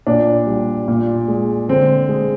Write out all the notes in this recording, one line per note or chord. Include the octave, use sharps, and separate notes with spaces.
A#2 D4
G3
A#2
G#3
D3 C4
G#3